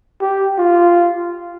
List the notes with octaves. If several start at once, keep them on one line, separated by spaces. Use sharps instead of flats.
G4
F4